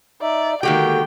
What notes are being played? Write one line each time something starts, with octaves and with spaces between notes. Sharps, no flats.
D#4 D5 E5
D3 D#3 G#3 A#3 F#4 G4 G5